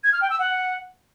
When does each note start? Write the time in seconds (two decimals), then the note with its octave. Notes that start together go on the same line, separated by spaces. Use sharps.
0.04 G#6
0.13 F6
0.21 G5
0.30 E6
0.39 F#5